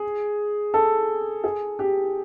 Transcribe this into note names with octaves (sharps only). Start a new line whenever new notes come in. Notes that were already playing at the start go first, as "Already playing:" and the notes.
Already playing: G#4
A4
G#4
G4